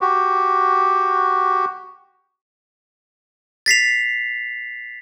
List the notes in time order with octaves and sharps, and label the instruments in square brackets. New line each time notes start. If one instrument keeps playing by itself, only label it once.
[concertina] F#4 G4
[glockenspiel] A6 B6 C7 F7